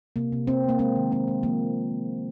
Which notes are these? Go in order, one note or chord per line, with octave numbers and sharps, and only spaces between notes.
C3 A#3
C3
C3 C4
C3
A#3
G#3 C4
D#3
G#3 C4
G#3
F3 A#3